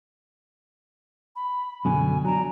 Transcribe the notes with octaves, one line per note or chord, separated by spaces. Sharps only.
B5
F#2 B2 D3 G#5
F#3 D4 A#5